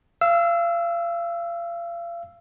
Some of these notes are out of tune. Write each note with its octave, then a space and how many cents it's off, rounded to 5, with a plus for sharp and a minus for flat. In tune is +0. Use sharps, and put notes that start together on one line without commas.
F5 -35 E6 +0